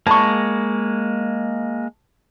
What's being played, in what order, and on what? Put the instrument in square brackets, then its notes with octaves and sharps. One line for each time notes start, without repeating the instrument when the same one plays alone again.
[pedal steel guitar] G#3 A#3 [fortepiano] A5 B5 C#6